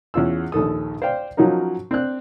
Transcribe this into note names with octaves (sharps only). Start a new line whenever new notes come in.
E2 C#4 F4 E6
A#1 D#2 A4 D#6
C5 D5 F5 G5
F3 F#3 C#4 D#4 A#4
C4 D4 F#6